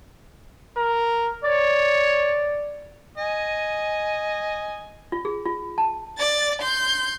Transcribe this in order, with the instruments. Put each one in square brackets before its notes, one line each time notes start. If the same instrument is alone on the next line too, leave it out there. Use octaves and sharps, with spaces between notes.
[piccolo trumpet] A#4
[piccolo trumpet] C#5 [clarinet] D5
[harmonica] D#5 G#5
[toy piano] F4
G#4
F4
A5
[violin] D5 A6
C6 G6